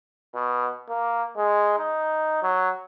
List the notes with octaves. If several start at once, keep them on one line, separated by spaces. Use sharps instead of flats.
B2
A#3
G#3
D#4
F#3